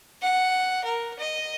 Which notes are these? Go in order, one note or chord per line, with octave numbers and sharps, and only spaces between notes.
F#5
A#4
D#5